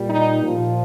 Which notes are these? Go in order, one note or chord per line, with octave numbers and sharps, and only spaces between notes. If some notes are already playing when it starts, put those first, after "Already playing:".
Already playing: A#2 G3
D#4
A#2 F3